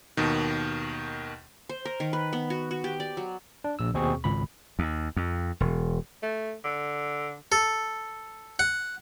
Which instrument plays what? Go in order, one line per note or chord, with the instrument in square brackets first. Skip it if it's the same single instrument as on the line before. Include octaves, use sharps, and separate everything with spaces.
[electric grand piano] D#2 B2 D#3
[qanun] C5
A#4
D#3
B4
B3
F#4
F#4
G4
D5
F#3
[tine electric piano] D4
A#1 E6
D#2 B2 C4 G#4 C#6
G#1 C#2 B5
[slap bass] D#2
F2
E1
[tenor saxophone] A3
D3
[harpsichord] A4
F#5